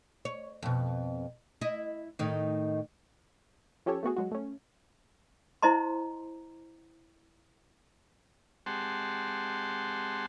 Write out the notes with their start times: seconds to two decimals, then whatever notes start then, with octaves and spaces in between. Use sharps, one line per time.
0.25 C#5
0.63 F2 B2
1.61 E4 D#5
2.19 A2 D#3 D#4
3.86 F3 C#4 G4 A4 C#5
4.03 A3 B3 F#4 G#4
4.17 F#3 G#3 F#4
4.32 A3 C#4
5.62 E4 C5 D#5 A#5 C6
8.66 G#3 C4 G4 F#5 A5 C6